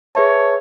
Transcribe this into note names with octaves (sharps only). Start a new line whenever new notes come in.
G#4 B4 C#5 E5 A5